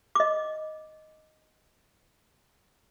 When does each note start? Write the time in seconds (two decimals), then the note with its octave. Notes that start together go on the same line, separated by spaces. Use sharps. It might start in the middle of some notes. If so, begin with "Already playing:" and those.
0.15 D#5 D6